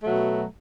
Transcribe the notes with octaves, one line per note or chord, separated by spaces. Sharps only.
B2 F#3 A3